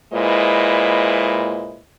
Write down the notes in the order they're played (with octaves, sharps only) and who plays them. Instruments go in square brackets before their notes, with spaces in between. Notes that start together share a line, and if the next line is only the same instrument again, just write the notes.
[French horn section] A#2 G#3 E4 B4 C5 D#5